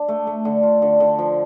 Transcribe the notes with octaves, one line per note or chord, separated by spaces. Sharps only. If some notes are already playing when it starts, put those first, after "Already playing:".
Already playing: D4
A3
A3
D3
F4
D3
D3
F3